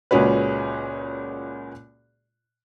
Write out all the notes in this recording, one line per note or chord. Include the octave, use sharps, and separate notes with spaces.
C#2 A#2 G#3 C#4 F#4 B4